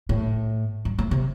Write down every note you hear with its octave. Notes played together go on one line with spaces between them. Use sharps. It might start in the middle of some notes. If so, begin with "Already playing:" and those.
A2
G2
A2
C3